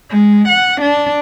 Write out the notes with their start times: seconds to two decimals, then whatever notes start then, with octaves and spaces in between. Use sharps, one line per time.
0.10 G#3
0.48 F#5
0.81 D4